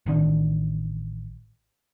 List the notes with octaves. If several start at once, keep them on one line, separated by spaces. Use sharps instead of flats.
A1 D#3 D4